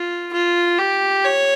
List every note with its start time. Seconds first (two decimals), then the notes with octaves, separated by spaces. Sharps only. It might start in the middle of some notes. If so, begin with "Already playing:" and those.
Already playing: F4
0.33 F4
0.79 G4
1.25 C#5